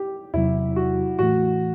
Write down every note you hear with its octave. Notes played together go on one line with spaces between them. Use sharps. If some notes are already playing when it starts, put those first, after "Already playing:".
Already playing: G4
E2 C3 F#3 E4
F#4
A2 E3 A3 F#4